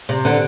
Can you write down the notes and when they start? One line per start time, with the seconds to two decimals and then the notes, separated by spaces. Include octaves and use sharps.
0.09 C3
0.25 D3